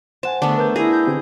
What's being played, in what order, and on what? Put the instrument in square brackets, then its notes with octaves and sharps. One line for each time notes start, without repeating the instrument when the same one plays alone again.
[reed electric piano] C5 F#5 G#5 [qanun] A5
[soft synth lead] D3 [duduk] A3 [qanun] B3 D4
[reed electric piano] A#4 G6 [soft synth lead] B4
[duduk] E4 [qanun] G#4 A#5
[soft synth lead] G6
[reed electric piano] D3 C4 G4